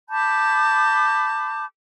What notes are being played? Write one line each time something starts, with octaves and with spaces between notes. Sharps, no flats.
A5 B5 D6 G6